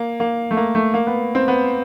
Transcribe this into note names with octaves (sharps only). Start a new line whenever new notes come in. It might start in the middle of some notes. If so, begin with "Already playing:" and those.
Already playing: A#3
A#3
A3
A#3
A3
A#3
B3
C4
B3